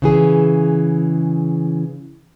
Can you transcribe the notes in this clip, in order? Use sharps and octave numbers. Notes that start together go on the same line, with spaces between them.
C#3 E3 G#4